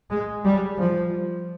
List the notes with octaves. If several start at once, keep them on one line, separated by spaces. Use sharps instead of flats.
G#3
G3
F3